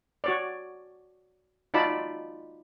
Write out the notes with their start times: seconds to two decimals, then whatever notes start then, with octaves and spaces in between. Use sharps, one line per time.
0.24 F#4 C#5 D5
1.74 D#4 F4 F#4 D5 A5 B5